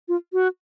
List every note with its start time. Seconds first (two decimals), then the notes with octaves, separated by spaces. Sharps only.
0.08 F4
0.33 F#4